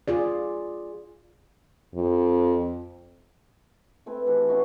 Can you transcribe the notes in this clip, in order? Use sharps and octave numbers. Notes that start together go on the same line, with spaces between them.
F4 G#4 D5
F2
A3 C4 G#4 B4
E3 F#4 G4 A4
C4 C#4 D#4 F#4